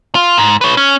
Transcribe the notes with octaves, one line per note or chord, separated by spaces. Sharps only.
F4
G#2
B4 C#5
C#4